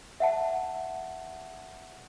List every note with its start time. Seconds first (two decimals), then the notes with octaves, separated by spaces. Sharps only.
0.20 E5 F#5 A5